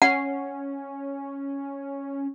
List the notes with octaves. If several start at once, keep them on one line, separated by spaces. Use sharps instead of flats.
C#4 F#5